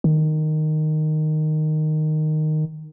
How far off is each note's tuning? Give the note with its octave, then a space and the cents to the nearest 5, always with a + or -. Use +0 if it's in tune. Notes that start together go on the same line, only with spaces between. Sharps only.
D#3 -10